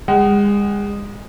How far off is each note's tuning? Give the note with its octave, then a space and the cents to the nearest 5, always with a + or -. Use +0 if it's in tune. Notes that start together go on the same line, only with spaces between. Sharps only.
G#3 -35 F#5 +35